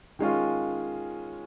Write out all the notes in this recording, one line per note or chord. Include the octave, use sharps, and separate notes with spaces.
D#3 G#3 C#4 F4